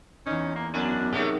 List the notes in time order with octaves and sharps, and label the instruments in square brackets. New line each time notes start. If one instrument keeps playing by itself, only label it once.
[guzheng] E2 D#4 [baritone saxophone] C#4
[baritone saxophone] A#3
[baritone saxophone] F#2 [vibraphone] B3 F#4 [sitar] D4
[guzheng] C3 F#3 [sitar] A3 B3 G4 [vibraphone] D#4 G#4 A#4